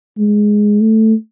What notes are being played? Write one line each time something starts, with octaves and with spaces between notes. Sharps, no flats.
G#3
A3